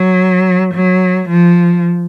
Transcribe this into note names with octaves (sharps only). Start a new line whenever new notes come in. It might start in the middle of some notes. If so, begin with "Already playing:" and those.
Already playing: F#3
F#3
F3